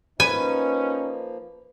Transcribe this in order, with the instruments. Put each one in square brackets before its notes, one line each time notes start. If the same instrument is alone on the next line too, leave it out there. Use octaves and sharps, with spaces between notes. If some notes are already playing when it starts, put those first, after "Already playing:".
[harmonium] F3 A#3 [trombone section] C#4 D#4 [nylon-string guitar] B4 [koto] G#5